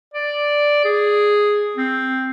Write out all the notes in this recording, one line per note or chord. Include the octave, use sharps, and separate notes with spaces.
D5
G#4
C4